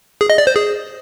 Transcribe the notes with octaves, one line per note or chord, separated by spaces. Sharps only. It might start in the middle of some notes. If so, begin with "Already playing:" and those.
G#4
D#5
D5
C5
G#4